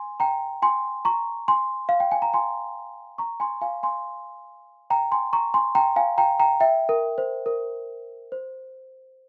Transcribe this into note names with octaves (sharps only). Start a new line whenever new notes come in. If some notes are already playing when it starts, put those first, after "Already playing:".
Already playing: G#5 C6
G5 A#5
G#5 C6
A#5 C#6
G#5 C6
F5
G5
G#5
A#5
G#5 C6
A#5 C#6
G#5 C6
F5 G#5
G#5 C6
G5 A#5
G#5 C6
A#5 C#6
G#5 C6
G5 A#5
F5 G#5
G5 A#5
G5 A#5
E5 G5
A#4
C5
A#4
C5